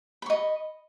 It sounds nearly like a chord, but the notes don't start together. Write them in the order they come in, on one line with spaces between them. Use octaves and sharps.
B5 C#6 D#5